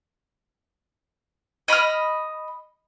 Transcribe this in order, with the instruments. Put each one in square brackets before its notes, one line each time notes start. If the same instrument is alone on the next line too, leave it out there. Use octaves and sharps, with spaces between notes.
[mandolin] D#5 B5 D6 F6